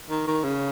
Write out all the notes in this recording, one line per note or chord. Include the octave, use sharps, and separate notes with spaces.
D#3
D#3
C#3